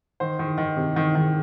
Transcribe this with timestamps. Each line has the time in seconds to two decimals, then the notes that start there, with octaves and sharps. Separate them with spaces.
0.20 D#3 C5
0.39 D#3
0.58 D#3
0.77 C3
0.96 D#3
1.15 D#3